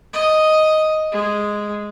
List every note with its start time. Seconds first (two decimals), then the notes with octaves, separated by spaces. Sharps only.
0.14 D#5
1.12 G#3